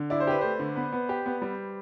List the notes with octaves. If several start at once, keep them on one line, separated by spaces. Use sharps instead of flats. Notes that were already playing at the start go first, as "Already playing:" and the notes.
Already playing: D3
E4 D5
C5
G4 B4
A3 C5
D3
B3 B4
B3
G4
B3
G3